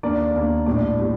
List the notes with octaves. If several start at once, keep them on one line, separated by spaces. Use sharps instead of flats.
D#2 D#3 A#3 D4 D5
D#2 D#3 A#3 D4
A#1 A2 G3 D4 D5
A2 G3